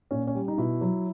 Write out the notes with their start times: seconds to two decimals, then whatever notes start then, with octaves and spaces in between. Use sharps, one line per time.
0.11 A#2 C#4
0.27 C#4
0.35 G3
0.48 D#4
0.58 B2 E4
0.81 F#3